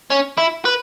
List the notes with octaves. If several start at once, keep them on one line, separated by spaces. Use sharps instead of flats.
C#4
E4
B4